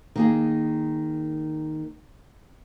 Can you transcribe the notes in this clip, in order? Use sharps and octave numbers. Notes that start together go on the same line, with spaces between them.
D#3 A#3 G#4